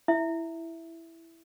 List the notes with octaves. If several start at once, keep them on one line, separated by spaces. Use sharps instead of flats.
E4 E5